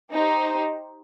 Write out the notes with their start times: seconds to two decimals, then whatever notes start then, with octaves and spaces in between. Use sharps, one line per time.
0.11 D#4 G4 C5